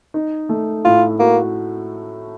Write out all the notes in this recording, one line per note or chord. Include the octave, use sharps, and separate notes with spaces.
D#4
A3
A2 F4
A#3 F#4